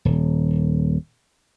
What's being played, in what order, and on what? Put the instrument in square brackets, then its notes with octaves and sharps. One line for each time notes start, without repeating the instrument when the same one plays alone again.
[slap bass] D#1